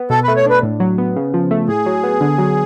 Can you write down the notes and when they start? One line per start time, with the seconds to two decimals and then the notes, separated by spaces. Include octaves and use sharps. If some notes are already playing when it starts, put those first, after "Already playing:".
Already playing: B3
0.10 B2 A4
0.24 A3 B4
0.36 C#5
0.46 D4 B4
0.63 A2
0.80 F#3
0.98 B3
1.16 C#3
1.34 F3
1.51 A3
1.68 A2 G#4
1.86 F#3
2.04 B3
2.21 D3
2.38 F#3